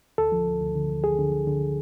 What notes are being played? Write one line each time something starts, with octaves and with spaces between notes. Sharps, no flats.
D2 A4
F3
D2
D2
D3
D2
D2 G#4
D3
D2
D3